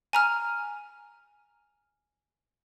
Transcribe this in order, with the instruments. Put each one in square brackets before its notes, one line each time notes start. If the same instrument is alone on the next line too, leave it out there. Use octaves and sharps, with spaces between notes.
[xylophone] G#5 A#5 F6